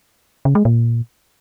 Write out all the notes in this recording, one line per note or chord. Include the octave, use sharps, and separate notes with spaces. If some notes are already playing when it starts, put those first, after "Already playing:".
C#3
G#3
A#2